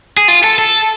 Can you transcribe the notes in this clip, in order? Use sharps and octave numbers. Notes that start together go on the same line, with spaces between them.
G#4
F4
A4
A4